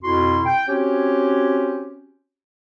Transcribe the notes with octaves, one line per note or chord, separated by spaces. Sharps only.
F2 B2 E4 F#4 C6
G5
C4 C#4 F#4 G4 C#5